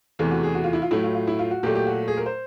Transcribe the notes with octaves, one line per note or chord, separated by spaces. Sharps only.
E2 C3 E3 A3
F#4
G#4
F#4
F4
E4
F4
A2 F#3 A3 E4
F4
F4
E4
F4
F#4
A#2 F#3 A3 G4
G4
F#4
G#4
A#4
C5